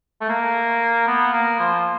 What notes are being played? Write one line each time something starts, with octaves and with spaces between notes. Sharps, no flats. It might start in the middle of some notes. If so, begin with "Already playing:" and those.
A3
A#3
B3
A#3
F3